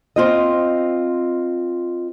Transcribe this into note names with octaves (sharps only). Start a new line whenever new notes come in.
C4 F4 D#5